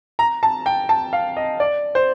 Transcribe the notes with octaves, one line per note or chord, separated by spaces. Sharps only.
A#5
A5
G5
A5
F5
D#5
D5
C5